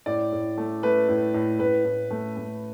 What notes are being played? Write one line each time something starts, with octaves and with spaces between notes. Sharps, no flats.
A2 D5
A2
A3
A3 B4
A2
A2
A2 B4
A2
A3
A3